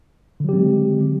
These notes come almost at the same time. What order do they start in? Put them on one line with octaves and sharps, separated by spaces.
D3 F#3 G4 C4 G#3